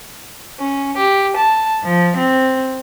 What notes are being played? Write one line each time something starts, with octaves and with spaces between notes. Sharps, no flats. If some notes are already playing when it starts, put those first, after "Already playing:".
C#4
G4
A5
F3
C4